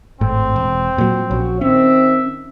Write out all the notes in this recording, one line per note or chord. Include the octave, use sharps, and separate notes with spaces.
G#1 A2 C4
E1
A#2 F#3
A#1 C#4 F#4 C#5
D#3 C4 C#4 E5